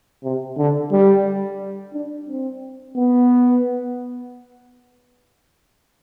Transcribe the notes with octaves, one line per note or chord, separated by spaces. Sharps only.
C3
D3
G3
D4
C4
B3